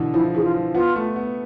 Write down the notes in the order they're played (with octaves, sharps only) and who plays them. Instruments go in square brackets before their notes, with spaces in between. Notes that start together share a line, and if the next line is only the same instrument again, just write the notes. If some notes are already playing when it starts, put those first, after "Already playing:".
Already playing: [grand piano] B2 D3 E3
[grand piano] F3 [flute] E4
[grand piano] E3 [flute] G#4
[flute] F4
[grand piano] F3
[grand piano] B3 [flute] F4
[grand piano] A3
B3